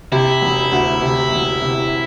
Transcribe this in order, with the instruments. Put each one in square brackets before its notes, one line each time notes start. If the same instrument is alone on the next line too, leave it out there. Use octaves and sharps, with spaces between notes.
[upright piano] C3 [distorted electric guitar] E4
[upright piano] E1
D2
C3
E1
C3